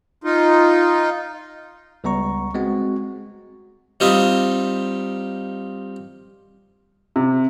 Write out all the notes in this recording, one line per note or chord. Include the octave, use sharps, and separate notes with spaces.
D#4 F4
C#2 G3 B3 A#5 C#6
G#3 C4 F#4
G3 C4 D#4 F4 D#5 E5
C3